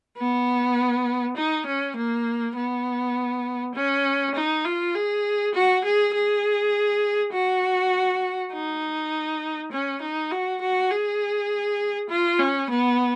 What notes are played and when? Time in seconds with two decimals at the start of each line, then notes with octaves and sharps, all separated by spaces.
0.17 B3
1.36 D#4
1.66 C#4
1.96 A#3
2.56 B3
3.75 C#4
4.34 D#4
4.65 F4
4.94 G#4
5.54 F#4
5.84 G#4
6.14 G#4
7.32 F#4
8.53 D#4
9.72 C#4
10.01 D#4
10.31 F#4
10.61 F#4
10.91 G#4
12.10 F4
12.39 C#4
12.70 B3